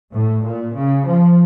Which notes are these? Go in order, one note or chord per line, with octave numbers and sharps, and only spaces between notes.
A2
A#2
C#3
F3